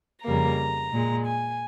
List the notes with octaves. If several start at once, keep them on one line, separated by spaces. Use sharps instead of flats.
F2 C#3 G3 A#3 A#5
A#2 G#3
G#5